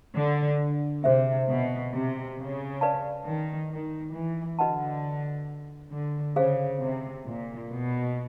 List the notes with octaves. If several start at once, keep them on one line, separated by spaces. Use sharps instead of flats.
D3
C3 G#4 C5 E5
B2
C3
C#3
B4 D5 F5 A5
D#3
D#3
E3
D3 F#4 B4 D#5 F#5 A5
D3
C#3 G#4 C5 F5
C3
A#2
B2